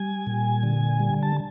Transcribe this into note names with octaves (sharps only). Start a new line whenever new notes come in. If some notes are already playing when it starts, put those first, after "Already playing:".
Already playing: G3 G#5
A#2
D3
G3
A5